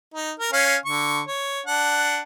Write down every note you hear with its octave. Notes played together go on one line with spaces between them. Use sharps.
D#4
A#4
C#4 F5 G#5
D3 C#6
C#5
D4 F#5